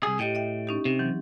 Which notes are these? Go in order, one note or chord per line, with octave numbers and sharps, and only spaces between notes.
C2 G#4
A2 G4 D#5 G5
D#5 E5 G5
C#4 D#4 G4
C3
E3 F#3 C4